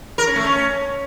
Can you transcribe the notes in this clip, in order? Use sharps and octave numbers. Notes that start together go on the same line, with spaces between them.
A#4
C#4
A3
C#4